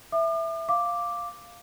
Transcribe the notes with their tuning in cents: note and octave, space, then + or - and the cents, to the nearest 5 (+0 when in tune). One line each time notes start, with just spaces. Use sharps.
E5 +0 D6 +45
F5 +0 D6 +0